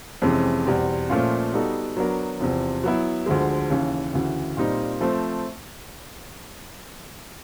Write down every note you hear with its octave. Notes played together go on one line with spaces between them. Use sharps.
F2 C3 E3 G#3 C#4
E2 B2 G3 C4
A#2 F3 A3 C#4 F4
G3 B3 D#4 F#4 A4
F#3 B3 D4 F#4 A#4
E2 C3 F3
F#3 B3 E4
D2 D3 F3 G#3
D#2 C#3 E3
D2 C#3 E3
A#2 G3 C4 D#4
F3 A3 C4